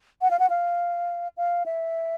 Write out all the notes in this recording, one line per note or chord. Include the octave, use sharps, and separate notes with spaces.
F#5
F5
F#5
F5
F5
E5